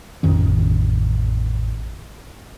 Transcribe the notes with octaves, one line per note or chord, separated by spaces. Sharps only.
A1 F2 D#3 C#4